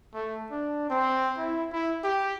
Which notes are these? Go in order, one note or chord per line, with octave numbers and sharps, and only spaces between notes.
A3
D4
C4
E4
E4
G4